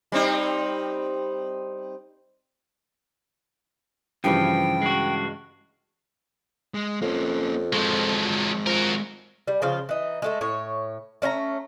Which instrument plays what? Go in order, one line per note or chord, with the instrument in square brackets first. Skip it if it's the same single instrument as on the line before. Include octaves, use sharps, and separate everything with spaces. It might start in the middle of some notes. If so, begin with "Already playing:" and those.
[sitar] G3 C4 D#4
[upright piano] G2 C#3 E3 [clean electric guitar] F3 [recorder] G5
[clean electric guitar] G#3 F#4
[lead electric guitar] G#3
[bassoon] F2 [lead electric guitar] A#3 C#4
[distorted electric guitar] F3 F#3 [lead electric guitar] G#3 C4
[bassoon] F3 [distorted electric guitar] F#4 A#4
[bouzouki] G3
C#3 F3 F4
E3 D#4
G#3 A3 A4
A2 C#5
A3 C#4 G#5 A#5